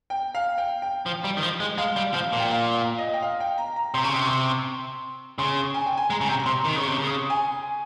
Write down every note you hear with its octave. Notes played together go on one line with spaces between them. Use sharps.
G5
F5
G5
G5
F3
G3
D#3
F3
G#3
G#3 F5
G3
F3 F5
A#2
G5
F5
F5
D#5
G5
F5
G5
A#5
A#5
C3 C6
C#3 C#6
C3 C6
C#6
C6
C#3 C6
G#5
G5
G#5
G#3 A#5
C#3
C3
A#5
C3 C6
D#3
C#3
C3 C#6
C#3
D#6
G#5